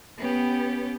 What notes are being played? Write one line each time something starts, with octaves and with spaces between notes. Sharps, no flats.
B3 C#4 G4